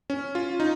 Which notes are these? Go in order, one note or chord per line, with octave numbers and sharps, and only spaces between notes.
C#4
F4
D#4